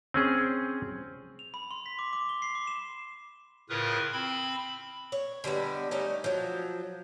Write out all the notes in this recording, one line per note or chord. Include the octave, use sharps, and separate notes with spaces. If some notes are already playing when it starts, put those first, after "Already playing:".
C4 C#4 G#4
F7
B5
C6
B6
D6
D6
G7
C7
D6
E7
A2 C#3 F4 A#4 B4 D#6
C4 B5
C#5
D3 G3 G#3 B3
G3 A3 C#4 D#4
F3 F#3